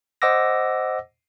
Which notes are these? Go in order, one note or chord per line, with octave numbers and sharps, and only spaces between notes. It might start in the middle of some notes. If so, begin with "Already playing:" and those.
C5 D#5 F#5 D6 E6 A#6